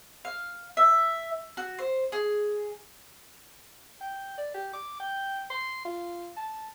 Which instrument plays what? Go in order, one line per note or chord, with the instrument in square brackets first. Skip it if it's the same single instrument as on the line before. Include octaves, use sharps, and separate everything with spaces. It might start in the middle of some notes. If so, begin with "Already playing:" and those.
[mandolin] F5
E5
F#4
C5
G#4
[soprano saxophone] G5
D5
G4
D6
G5
C6
F4
A5